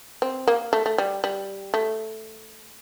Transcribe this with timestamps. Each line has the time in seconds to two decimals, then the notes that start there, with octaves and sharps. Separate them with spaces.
0.22 C4
0.48 A#3
0.73 A3
0.86 A3
0.98 G3
1.24 G3
1.74 A3